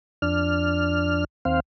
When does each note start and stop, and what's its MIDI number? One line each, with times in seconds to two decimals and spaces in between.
0.22 1.24 41
0.22 1.24 62
0.22 1.24 89
1.45 1.60 39
1.45 1.60 60
1.45 1.60 77